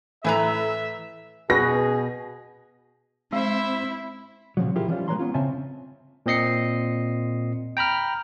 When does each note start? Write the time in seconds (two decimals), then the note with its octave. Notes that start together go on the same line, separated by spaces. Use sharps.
0.25 A2 E3 A4 B4 E5 G#5 A#5
1.50 B2 F#4 G#4 B4 A#6
3.33 G#3 C4 E4 C5 E5
4.57 A#2 C#3 F3 F#3
4.76 E4 F4 G4 G#4 A#4 C5
4.88 E3 F3 G3 C#4 D#4 F4
5.08 G#3 G4 B4 C#5 A#5 C6
5.19 B3 C#4 F4
5.34 C#3 C4 E5 G#5 A5
6.26 A#2 C4 D#5 C7 C#7
7.77 G5 A#5 B5 F6